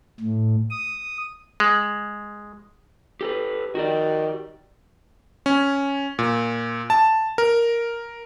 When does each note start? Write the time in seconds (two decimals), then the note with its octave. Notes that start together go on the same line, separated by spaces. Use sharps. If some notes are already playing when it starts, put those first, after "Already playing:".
0.20 A2
0.71 D#6
1.60 G#3
3.21 G4 A4 B4
3.75 D#3 F#4 G4 D5
5.46 C#4
6.19 A#2
6.90 A5
7.38 A#4